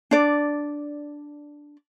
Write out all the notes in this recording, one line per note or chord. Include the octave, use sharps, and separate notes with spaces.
D4 D5